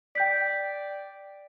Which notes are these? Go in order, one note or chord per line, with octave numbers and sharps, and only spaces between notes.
D5 G5 G6 B6